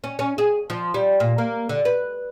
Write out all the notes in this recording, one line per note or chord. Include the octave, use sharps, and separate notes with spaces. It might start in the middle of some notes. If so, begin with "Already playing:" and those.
C#4
C#4
G#4
F3
G3
A#2
A#3
D3
B4